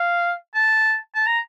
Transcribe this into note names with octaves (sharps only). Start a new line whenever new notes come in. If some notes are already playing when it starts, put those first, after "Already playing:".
Already playing: F5
A5
A5
A#5